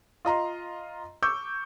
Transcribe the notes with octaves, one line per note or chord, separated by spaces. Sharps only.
F4 D#5 A#5 C6
C#6 D6 E6 G6